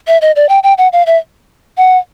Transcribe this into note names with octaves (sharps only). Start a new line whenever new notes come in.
E5
D#5
D5
G5
G5
F#5
F5
E5
F#5